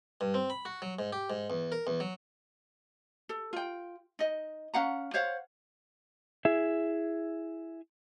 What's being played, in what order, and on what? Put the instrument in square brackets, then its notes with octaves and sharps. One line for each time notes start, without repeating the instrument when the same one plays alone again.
[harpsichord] G2
C4
B5
F#4
F#3
G#2
G4
G#2
E2
A#4
E2
F#3
[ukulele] A4
F4 G5
D#4 D#5
C#4 F5 F#5 A#5
C5 C#5 F5 F#5
[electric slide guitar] E4 G#4 E5